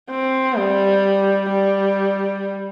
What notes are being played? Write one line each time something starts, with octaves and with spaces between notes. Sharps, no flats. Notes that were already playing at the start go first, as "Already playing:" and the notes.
C4
G3
G3